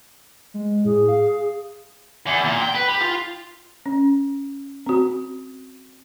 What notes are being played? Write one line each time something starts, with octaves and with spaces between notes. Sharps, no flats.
G#3
A2 G#4
F5
E2
A#2
G5
B4
G4
F4
C#4
C4 F#4